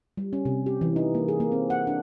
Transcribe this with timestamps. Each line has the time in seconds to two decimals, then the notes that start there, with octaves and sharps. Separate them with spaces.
0.17 G3
0.33 C#4
0.45 C3
0.66 G4
0.81 E3
0.96 D#4
1.15 A#3
1.28 G#4
1.40 A#3
1.52 C4
1.70 F#5
1.87 D4